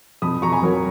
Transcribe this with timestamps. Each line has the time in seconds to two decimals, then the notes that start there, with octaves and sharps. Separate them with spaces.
0.22 F2 B5 D#6
0.42 F2 A#5 C#6
0.52 G#5 B5
0.62 F#3 A#4 C#5